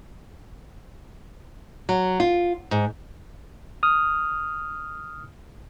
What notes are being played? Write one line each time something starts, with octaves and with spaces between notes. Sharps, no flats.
F#3
F4
G#2
D#6 F6